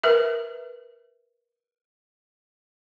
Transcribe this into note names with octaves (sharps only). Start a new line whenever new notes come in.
A#4 B4 E5